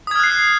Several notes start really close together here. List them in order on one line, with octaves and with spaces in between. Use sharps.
D#6 G#6 F6 F#6 C7